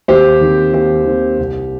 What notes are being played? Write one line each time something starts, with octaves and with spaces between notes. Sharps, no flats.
D#2 G4 C5
D#3 C4
D#2 G4
D#3 C4
C2